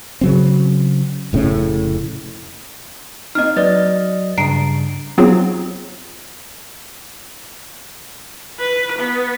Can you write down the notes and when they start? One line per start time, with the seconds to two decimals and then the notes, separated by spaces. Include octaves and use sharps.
0.21 C#3 F#3 C4
1.33 F1 A2 C#3 C#4
3.35 A#3 C4 D#4 D#5 F6
3.57 F#3 B4 D5 D#5 A6
4.38 G2 C#3 A#5 C7 D7
5.18 F#3 B3 C4 D#4 F4 G#4
8.59 B4
8.99 B3